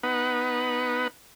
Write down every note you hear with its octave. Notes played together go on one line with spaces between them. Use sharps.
B3 D#4 B4 F#5